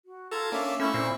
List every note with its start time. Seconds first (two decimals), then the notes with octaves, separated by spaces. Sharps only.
0.05 F#4
0.31 F4 A4 A5 A#5 G#6
0.52 A#3 C#4 D4 E5 D6
0.80 A3 C#4 E4 B5 C#6 E6
0.94 A#2 C4